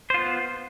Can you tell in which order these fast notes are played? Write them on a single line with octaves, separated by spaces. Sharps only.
C5 F4 B3